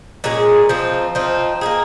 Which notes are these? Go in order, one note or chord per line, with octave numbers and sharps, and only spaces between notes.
A#2 G#3 C#4 G#4
F3 C4 D#4
F3 C4 D#4
A#3 D#4 G#4